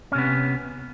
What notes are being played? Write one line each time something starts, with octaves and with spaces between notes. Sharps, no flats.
C3 B3 C#4